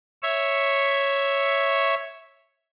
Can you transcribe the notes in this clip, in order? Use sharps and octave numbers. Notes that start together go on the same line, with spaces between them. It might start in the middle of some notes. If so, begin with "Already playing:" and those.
C#5 E5